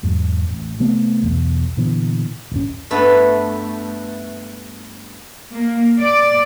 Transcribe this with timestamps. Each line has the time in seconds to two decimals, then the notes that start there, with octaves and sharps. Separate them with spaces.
0.03 E2 G#2 F#3
0.49 A1
0.80 C3 A3 B3 C4
1.22 B1 E2
1.77 A#2 D3 E3 B3
2.52 D#1 G#1 C#4
2.90 G2 A3 B3
5.51 A#3
6.00 D5